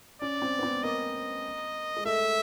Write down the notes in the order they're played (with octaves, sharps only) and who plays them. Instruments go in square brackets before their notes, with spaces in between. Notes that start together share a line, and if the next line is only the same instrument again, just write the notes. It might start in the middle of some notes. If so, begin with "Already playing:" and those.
[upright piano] C#4 [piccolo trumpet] D5
[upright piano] C4
B3
C4
[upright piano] A#3 [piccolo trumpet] D#5
[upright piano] G#3
[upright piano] A3 [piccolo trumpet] E5